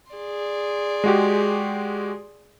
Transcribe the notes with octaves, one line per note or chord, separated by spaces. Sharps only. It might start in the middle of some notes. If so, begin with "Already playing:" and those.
G#4 D5 C6
G#3 F#4 G4